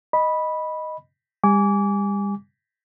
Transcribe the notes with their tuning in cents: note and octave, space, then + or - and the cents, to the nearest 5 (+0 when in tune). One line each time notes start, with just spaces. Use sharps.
D#5 +0 B5 -10
G3 +35 G#5 +0 D6 -30